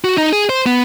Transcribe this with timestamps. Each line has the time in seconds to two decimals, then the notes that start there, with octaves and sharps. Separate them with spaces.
0.04 F#4
0.18 D#4
0.33 G#4
0.49 C5
0.66 B3